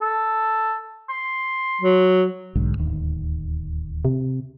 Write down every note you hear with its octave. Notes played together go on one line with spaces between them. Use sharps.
A4
C6
F#3
B1 G#2 D3
D1 D#2
C3